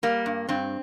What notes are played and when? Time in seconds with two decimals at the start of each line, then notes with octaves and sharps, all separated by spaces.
0.03 G3 A#3
0.26 G2
0.49 G2 C4